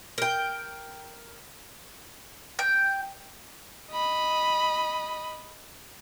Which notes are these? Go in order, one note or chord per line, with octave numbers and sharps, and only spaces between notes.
A#4 G5
G5
D#5 B5